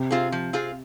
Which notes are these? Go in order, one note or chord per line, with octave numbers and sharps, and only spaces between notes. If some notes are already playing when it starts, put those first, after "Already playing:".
Already playing: C3
C4 F4 G#4
F3
C4 F4 G#4